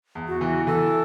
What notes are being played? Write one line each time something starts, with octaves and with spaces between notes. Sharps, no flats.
E2
F#4
E3
E3 A4